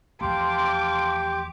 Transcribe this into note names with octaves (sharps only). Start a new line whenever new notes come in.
E2 F3 A3 G4 F5 A5 C6 D6